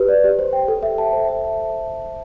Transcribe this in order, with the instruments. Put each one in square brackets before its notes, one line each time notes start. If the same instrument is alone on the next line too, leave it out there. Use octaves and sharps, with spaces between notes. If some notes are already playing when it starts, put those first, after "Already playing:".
Already playing: [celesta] G4 B4
D5
G4
C5
G5
A4
E5
A5
C5
E5